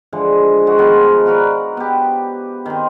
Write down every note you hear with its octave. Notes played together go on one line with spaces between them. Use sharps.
D3 E3 F3 G#3
G#3 F#4
D#3 F3 B3 F4
F#4 A#4 B4 D5
B3 G4
D#3 C4